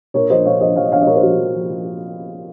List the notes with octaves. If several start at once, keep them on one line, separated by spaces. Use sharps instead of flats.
A#2 A#4 C#5
F3 C5 D#5
A#2 C#5 F5
F3 C5 D#5
F3 C#5 F5
D#5
F3 C#5 F5
D#5
A#2 A#4 C#5
C5
F3 F#4 A#4
F3
F3
F3